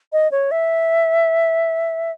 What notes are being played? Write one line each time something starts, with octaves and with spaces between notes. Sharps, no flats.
D#5
C#5
E5